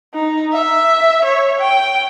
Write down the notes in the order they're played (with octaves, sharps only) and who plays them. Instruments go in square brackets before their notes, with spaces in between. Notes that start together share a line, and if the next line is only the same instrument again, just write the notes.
[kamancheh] D#4
E5
C#5
G5